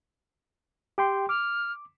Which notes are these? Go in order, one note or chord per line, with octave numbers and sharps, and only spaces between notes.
G4 G5 C6
D6 F6